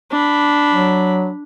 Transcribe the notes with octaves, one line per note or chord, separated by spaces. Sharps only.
D4 B5
F#3